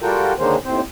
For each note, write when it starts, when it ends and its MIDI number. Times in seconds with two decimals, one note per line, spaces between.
0.01 0.33 55
0.01 0.33 65
0.01 0.33 66
0.01 0.33 69
0.01 0.33 70
0.01 0.33 79
0.39 0.56 50
0.39 0.56 51
0.39 0.56 56
0.39 0.56 58
0.39 0.56 61
0.39 0.56 72
0.65 0.81 39
0.65 0.81 45
0.65 0.81 60
0.65 0.81 72